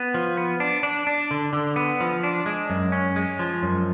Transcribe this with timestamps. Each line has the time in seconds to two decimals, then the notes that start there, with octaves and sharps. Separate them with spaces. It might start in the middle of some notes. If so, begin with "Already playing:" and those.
Already playing: B3
0.14 F3
0.37 B3
0.60 D4
0.83 D4
1.07 D4
1.31 D3
1.53 D3
1.76 B3
2.00 F3
2.23 D4
2.46 G#3
2.70 F#2
2.92 C#4
3.16 G#3
3.39 F3
3.63 F#2